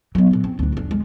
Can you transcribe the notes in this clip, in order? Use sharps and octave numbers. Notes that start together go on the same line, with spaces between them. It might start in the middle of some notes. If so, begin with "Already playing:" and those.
F#3 B3
A#1 F#3
C4
D2 D4
F#1 D4
G#3